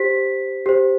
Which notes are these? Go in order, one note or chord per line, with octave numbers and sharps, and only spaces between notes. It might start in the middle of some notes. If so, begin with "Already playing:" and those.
Already playing: G4 C5 B6
G4 C5